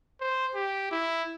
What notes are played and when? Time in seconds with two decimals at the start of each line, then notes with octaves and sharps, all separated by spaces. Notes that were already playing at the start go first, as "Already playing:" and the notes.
0.20 C5
0.55 G4
0.91 E4